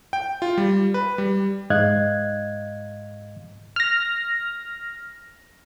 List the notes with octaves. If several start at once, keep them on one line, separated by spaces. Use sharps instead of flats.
G5
F4
G3
B4
G3
G#2 D#5 F5 F#6 G#6
F6 A#6